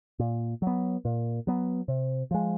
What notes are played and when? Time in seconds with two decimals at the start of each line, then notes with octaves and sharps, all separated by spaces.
0.19 A#2
0.62 F#3 B3
1.05 A#2
1.47 F#3 B3
1.88 C3
2.31 F3 G#3